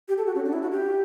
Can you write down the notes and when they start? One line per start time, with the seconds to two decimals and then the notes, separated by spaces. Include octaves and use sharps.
0.08 G4
0.18 A4
0.26 F#4
0.35 C#4
0.45 D4
0.53 E4
0.62 F#4
0.72 G4